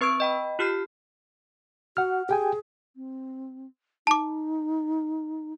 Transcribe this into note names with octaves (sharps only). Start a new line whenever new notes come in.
C4 B4 C#6 E6 G#6 D7
D#5 G5 B5
F4 G4 F6 G6 C7
F#4 F#5 F6
G4 G#4 G5 G#5
C4
D#4 A5 D6